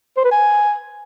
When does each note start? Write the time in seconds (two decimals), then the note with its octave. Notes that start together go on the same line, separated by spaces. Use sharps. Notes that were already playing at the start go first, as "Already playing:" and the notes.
0.17 C5
0.24 B4
0.31 G#5